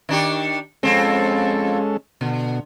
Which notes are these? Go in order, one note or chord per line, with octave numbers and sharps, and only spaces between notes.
D#3 D4 G4
F2 G#3 C4 C#4 A4
B2 D3